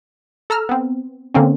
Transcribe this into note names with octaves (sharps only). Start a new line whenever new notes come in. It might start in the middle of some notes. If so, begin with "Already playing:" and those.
A4 A#5 E6 F6
B3 C4
D3 A#3 C4 C#4